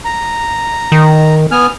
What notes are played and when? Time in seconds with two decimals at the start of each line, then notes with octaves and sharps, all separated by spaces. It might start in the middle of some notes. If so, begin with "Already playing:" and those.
0.05 A#5
0.92 D#3
1.51 B3 G#5 F6